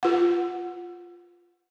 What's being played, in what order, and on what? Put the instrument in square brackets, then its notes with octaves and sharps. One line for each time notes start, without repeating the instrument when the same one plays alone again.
[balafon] F4 F#5